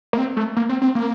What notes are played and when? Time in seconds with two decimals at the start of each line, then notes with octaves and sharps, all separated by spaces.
0.13 A#3
0.18 C4
0.37 A3
0.57 A#3
0.69 C4
0.82 C4
0.95 A#3